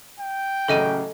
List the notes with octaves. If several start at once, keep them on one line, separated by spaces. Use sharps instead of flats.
G5
A1 C#3 F#3 A4 D#5 D#7